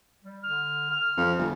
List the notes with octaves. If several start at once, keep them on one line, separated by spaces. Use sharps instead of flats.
G3
D3 F6
F6
F2
G1